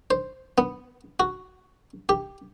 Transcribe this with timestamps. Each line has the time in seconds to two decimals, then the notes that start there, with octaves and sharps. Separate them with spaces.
0.11 C5
0.58 B3
1.20 F#4
2.09 G4